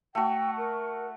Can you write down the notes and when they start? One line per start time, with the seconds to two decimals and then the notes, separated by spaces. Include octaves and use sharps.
0.15 A3 F#4 G5
0.57 A#4